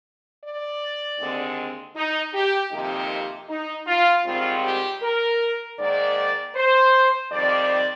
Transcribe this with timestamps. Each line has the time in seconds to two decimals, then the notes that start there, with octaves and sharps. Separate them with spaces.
0.44 D5
1.20 D#2 D3 G#3 C4
1.96 D#4
2.34 G4
2.72 F2 C3 D#3 A#3 D#4 G4
3.49 D#4
3.87 F4
4.25 G#2 D#3 G3 C4 F4
4.64 G4
5.02 A#4
5.78 G#2 D#3 A#3 D5
6.56 C5
7.31 F2 D#3 G3 C4 D5